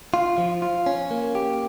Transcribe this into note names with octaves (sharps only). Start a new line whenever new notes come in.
F4
F3
F4
C#4
A#3
G4